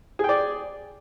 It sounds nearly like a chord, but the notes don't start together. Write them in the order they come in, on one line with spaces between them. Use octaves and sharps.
G#4 G5 D5